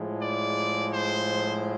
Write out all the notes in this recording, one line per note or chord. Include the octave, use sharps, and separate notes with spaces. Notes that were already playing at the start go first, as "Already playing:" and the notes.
Already playing: A2 F3 G#3
D5
C5